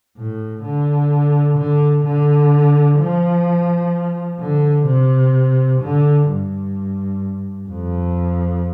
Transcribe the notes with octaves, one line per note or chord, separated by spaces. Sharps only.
A2
D3
D3
D3
F3
D3
C3
D3
G2
F2